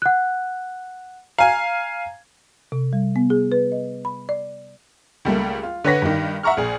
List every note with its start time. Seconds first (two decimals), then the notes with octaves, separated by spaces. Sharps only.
0.02 F#5 F#6
1.38 F5 G#5 A#5
2.72 C3
2.93 G3
3.16 B3
3.30 G#4
3.52 B4
3.72 D#5
4.05 B5
4.29 D5
5.25 C#2 G3 A3 A#3
5.63 F4
5.84 D3 B4 C#5 F#5 A#6 B6
6.02 G2 D#3
6.43 E5 F#5 A#5 C#6 F6
6.57 A#1 G#4